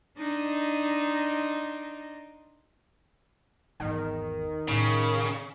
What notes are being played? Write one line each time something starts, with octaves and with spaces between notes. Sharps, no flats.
D4 D#4 D#5 C6
G#1 E2 D#3
A2 C#3 C#4